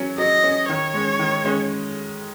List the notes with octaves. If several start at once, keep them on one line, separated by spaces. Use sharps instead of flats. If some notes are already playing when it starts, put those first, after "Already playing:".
Already playing: F#3 C#4
F#3 D#5
C#4
D#3 C#5
G#3 C#4
D#3
G#3 C#4